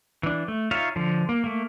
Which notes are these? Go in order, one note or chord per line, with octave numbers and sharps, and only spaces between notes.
E3 D4
A3
D#4 F4 C#5 E5 F5
D3 F3
A#3
A3 A#3